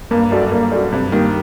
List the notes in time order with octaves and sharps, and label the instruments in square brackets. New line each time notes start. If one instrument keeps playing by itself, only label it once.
[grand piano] G2 [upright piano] A#3
[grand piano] F#2 [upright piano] F#4 A4 D5
[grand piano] G2 [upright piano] A#3
[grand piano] F#2 [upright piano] F#4 A4 D5
[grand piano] G2 [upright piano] C3
[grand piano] D#3 [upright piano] G3 A#3